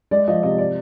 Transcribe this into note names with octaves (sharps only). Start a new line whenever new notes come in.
G#3 D5
F3 D#5
C3 D#5
D5